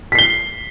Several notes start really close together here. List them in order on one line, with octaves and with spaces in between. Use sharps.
B6 C7 G7